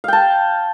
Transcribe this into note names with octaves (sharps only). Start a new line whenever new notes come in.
F5 G5 A5